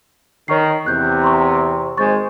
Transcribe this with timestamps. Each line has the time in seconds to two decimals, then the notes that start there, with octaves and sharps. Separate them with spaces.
0.48 D#3 C#5 C#6 C7
0.86 E2 C3 F#6 G6
1.22 A#5 C6 C#6
1.97 G#1 G#3 C5 C#6 A6